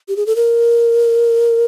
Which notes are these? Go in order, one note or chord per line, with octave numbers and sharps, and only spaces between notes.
G4
G#4
A4
A#4